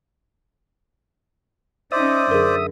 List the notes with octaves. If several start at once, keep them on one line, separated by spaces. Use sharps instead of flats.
C#4 D#4 C5 D5 E5 D#6
F#2 D3 G#4 A#4